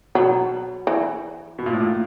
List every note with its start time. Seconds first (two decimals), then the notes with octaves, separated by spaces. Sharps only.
0.15 B2 F#3
0.87 E3
1.59 B2
1.66 A#2
1.73 A2
1.80 A#2